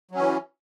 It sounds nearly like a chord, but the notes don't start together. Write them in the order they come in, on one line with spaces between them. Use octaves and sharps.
F#3 C#4 E3